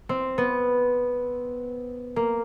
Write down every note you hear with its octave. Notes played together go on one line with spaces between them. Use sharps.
C4
B3
A#3